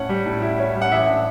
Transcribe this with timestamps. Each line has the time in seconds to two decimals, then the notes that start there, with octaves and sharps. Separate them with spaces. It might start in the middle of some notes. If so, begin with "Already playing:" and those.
Already playing: A2 C#4 E4 F#5
0.09 G3
0.26 A2
0.42 E4
0.58 C#4
0.75 G3
0.82 F#5
0.92 A1 E5
1.09 D4